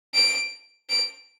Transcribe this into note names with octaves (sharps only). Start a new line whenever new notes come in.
D7
D7